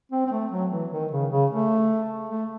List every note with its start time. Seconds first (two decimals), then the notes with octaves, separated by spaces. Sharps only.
0.12 C4
0.26 C4
0.32 A3
0.51 F#3
0.71 E3
0.91 D#3
1.11 C#3
1.31 C#3
1.51 A3
2.30 A3